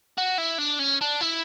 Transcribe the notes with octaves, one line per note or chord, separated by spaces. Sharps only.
F#4
E4
D4
C#4
D4
E4